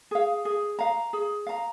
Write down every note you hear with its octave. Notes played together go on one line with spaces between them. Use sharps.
G#4 F5
G#4
F5 A#5
G#4
F5 A#5